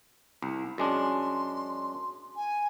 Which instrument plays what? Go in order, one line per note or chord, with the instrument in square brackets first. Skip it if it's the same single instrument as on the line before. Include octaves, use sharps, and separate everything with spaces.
[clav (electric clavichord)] C2
[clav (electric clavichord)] F#2 G#3 D4 [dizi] C6
[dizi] G#5